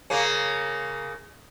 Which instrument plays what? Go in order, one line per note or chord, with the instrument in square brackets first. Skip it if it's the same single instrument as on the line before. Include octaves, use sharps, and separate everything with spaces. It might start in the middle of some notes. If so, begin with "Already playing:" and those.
[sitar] C#3 A#3 C#4